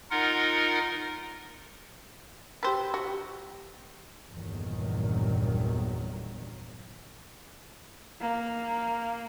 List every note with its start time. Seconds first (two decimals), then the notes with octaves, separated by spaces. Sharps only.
0.11 D#4 F4 A#4 D#5 F#5
2.63 G4 B4 C5 G5 E6
2.94 F#4
4.31 G1 E2 A#2 D#3 F#3
8.21 A#3